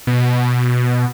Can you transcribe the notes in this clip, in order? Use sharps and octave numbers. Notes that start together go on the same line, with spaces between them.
B2